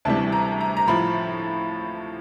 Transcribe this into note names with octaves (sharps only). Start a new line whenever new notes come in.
D2 C3 E3 G3 A5
A#5
A#5
A#5
A2 F3 B5